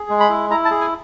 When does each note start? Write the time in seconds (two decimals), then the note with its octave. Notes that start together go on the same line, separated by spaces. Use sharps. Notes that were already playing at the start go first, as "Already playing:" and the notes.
Already playing: G#4
0.09 G#3
0.20 B5
0.29 E4
0.50 E4 A#5
0.65 A5
0.71 G#4
0.81 G#5